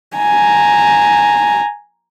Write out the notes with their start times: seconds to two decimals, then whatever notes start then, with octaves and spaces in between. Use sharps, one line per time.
0.17 G#5 A#5